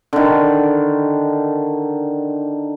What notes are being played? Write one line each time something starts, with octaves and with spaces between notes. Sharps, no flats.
D3 D#3